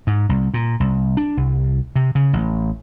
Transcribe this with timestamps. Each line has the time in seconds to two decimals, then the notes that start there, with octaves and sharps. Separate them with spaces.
0.07 G#2
0.29 C2
0.54 A#2
0.80 C2
1.17 D4
1.37 C2
1.96 C3
2.15 C#3
2.33 A1